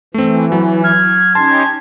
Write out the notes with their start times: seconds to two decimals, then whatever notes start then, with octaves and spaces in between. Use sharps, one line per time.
0.14 E3 A3 C4
0.52 F#3 E4
0.84 F6 G#6
1.35 C#4 D#4 G4 A5 C6